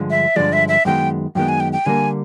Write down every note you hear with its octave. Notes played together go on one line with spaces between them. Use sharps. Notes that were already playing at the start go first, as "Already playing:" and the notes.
Already playing: G2 D3 F3 G#3
E5
G2 D3 F3 G#3 D5
E5
E5
F#2 D#3 G#3 B3 G5
F#2 D#3 G#3 B3 G5
G#5
G5
G5
D3 G3 A#3 G#5